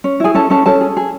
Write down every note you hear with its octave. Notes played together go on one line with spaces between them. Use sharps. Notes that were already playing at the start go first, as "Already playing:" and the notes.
C#4
E4 G#4 G#5
C#4 A4 A5
C#4 A4 A5
C#4 A4 A5
G#4
G#4